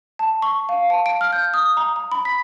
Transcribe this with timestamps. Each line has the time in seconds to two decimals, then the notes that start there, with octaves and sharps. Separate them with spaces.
0.19 A5
0.42 C#6
0.69 F5
0.90 A5
1.06 D7
1.21 F6
1.33 G6
1.54 D#6
1.77 A#5
1.96 A#5
2.12 B5
2.25 B6